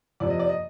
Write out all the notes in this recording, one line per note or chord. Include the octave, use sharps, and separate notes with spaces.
F2 C3 F3 D5
D#5
D5
D#5